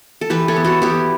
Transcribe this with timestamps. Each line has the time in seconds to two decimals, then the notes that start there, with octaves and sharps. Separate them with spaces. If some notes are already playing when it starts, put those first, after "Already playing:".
0.21 A4
0.30 E3 G4 B4
0.48 A4 C#5
0.56 B3
0.65 F#4 A4
0.82 B3 E4 G4